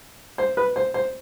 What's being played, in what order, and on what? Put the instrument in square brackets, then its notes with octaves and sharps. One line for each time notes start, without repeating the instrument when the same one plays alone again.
[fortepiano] C5
B4
C5
C5